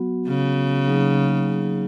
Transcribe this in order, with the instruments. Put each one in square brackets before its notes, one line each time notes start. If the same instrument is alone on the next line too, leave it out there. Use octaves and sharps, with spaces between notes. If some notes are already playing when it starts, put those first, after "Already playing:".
Already playing: [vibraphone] F#3 B3 F#4
[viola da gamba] C#3
[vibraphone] F#3 A#3 D#4 G#4